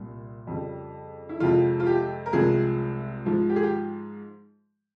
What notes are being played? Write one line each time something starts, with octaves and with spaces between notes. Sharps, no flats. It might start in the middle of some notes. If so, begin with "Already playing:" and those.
Already playing: C2 A#2 G3
F2 C#3 G3
E4
F2 C3 F3 G#3 F4
F4
G4
A#4
C2 C3 F3 G#3 G#4
G#2 F3 G#3
G4
G#4
G4